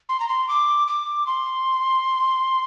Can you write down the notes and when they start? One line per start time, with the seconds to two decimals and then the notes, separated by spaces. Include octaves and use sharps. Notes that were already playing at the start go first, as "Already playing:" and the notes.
0.09 C6
0.20 A#5
0.29 C6
0.48 D6
0.88 D6
1.27 C6